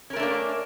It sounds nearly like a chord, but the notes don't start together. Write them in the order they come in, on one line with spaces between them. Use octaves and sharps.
C#4 A#4 A3 D4 A#3